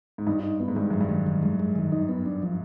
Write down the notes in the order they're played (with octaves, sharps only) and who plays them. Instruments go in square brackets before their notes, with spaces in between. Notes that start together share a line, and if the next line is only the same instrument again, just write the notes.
[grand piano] G#2
[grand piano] G2 [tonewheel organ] D#4
[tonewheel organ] D#4
B3
[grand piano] G#2
[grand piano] G2 [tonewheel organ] G#3
[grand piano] F#2 [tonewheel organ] G#3
[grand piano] G2
[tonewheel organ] D#3
D#3
G#3
G#3
D#3
D#4
B3
D4
F3